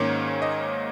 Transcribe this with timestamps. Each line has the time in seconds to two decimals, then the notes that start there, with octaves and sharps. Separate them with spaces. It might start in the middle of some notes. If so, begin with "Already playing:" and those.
Already playing: G#2 D#3 A#3 C#4 C#5
0.42 D#5